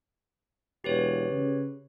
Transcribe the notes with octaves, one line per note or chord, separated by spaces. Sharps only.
E1 G4 B4 C#5
C#3